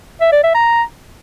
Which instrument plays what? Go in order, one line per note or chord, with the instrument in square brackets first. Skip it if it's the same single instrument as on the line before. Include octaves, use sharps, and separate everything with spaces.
[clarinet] E5
D5
E5
A#5